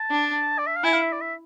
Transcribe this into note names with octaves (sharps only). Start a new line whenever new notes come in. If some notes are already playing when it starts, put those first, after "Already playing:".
Already playing: A5
D4
D5
E5
F5
E4 G#5
F5
E5
D5
E5